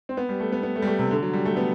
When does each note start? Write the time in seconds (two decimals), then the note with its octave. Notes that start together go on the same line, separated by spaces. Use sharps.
0.09 C4
0.17 B3
0.29 G3
0.40 A3
0.52 B3
0.63 B3
0.76 A3
0.82 G3
0.87 A3
0.99 C3
1.11 D3
1.22 F#3
1.33 G3
1.45 A3
1.57 B3